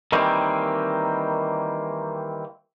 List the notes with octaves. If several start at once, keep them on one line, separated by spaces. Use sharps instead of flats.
D#3 E3 G3 A#3 C4